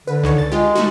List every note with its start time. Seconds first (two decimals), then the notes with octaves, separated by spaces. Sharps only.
0.07 D3 B4
0.23 C#2 D#3 C#5
0.38 A6
0.52 G#3 F4 G4
0.75 A3 D#4 F#4